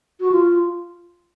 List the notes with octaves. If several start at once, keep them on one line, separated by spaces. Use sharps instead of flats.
F#4
F4